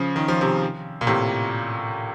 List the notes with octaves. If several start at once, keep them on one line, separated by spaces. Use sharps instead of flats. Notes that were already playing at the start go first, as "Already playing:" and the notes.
Already playing: C#3 F3
D#3
F3
C3 D#3
A#2
A2 C3